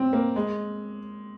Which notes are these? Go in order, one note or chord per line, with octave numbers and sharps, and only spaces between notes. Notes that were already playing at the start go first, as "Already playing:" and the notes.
Already playing: C4
A#3
G#3